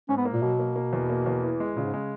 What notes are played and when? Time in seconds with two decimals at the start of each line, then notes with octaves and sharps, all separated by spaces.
0.09 G#2 C#4
0.18 B3
0.25 A#3
0.33 A#2
0.42 B2 F#3
0.59 A#3
0.76 A#3
0.93 E2
1.10 A#3
1.26 E2
1.43 E3
1.60 G#3
1.76 A#2 C#3
1.84 G#2
1.94 G#3